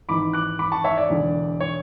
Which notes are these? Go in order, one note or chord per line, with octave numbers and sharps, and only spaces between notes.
G#1 G#2 E3 B5 D6
D6 F#6
B5 D6
A5 C#6
C#5 E5
D5
E1 E2 D3
C#5